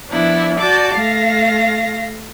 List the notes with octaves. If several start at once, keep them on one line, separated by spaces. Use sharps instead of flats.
F3 B3 D4 E4
F#4 D5 A5 D6 G6
A3 F5 A#6